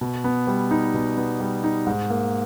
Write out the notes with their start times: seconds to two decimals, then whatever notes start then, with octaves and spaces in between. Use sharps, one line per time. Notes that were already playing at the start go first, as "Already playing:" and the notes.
0.01 B2
0.24 B3
0.47 G3
0.71 D#4
0.94 B2
1.17 B3
1.40 G3
1.64 D#4
1.87 G#2
2.10 A#3